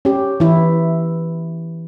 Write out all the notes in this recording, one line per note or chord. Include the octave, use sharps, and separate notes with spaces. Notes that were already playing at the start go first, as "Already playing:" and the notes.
C#4 G4
E3 E4